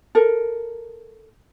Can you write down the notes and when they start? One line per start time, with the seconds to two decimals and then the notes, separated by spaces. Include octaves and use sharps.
0.15 A4 A#4